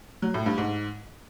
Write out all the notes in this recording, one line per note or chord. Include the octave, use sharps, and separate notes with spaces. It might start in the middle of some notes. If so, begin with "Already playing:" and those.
F#3
A2
G2
G#2